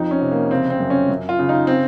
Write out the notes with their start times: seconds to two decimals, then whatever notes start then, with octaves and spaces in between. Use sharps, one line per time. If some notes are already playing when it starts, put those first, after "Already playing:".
Already playing: F2 D#4
0.11 C#4
0.21 C3
0.32 A#3
0.51 C#3 C4
0.70 C4
0.80 F#2
0.90 C#4
1.09 F#2
1.29 F4
1.39 C#3
1.49 D#4
1.67 C4